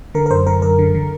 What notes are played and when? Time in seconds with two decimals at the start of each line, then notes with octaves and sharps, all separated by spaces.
0.14 D3 A#4
0.26 A#4
0.31 F#2 C5
0.46 D3 A#4
0.62 F#2 A#4
0.79 D3
0.95 D3